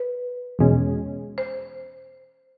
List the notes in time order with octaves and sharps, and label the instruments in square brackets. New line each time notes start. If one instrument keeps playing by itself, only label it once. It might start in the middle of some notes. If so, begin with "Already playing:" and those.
Already playing: [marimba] B4
[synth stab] E2 B2 G#3 C#4
[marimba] C5